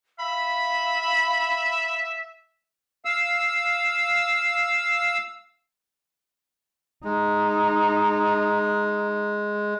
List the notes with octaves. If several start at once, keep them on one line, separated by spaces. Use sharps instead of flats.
E5 F5 B5
F5 E6
G#3 D#4